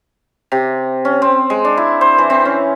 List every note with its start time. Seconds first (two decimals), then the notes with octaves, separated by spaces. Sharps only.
0.52 C3
1.05 C#4
1.22 C4
1.50 G#3
1.65 D4
1.77 E4
2.01 C5
2.18 E3
2.30 C4
2.45 C#4